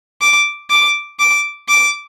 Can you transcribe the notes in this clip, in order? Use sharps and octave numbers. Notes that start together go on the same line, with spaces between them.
D6
D6
D6
D6